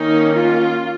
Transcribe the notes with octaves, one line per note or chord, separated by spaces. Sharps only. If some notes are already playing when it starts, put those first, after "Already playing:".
Already playing: D#3 A#3 C#4 D#4
F4